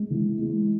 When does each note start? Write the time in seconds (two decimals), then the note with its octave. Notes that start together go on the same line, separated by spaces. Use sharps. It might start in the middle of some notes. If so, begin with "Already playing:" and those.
Already playing: G#3
0.10 E3
0.38 G#3